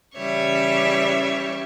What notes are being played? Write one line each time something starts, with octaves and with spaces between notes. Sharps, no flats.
C#3 E3 G3 C#5 E5